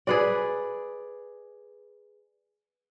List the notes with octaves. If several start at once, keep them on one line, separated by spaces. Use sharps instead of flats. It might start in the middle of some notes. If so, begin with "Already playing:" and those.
G#4 B4 D5